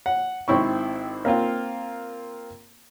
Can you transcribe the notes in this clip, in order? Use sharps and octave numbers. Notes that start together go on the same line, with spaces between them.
F#5
G#1 C4 E4 C#6
A#3 C4 F4